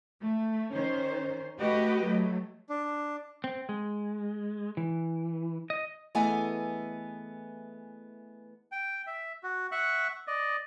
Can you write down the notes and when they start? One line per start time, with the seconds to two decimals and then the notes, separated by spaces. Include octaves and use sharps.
0.20 A3
0.73 D#3 C#4 C5
1.58 A3 F#4 G4 B4 D#5
2.05 F#3 A3
2.70 D4
3.44 C4
3.69 G#3
4.77 E3
5.70 D#5
6.15 E3 A3 B3 G#4 D#5 G#5
8.72 G5
9.07 E5
9.43 F#4
9.72 E5 F#5 C#6 F#6
10.27 D5 D#5